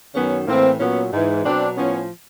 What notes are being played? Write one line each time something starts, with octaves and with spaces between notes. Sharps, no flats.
F#2 D#3 F#3 B3 C#4
A2 E3 A#3 C4
A#2 F#3 B3 C#4
G#2 E3
B2 F#3 C4 D4
A2 F3 B3 C#4